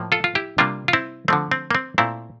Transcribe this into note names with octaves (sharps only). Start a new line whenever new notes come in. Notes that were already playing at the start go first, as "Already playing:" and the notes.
Already playing: A2 F3 A#3
F4 A4
F4
E4 G4
C3 G3 A#3 D4 F4
F4
C4 E4
D3 F3 A3 C4
C4
A#3
C4
A#2 A3 C4 E4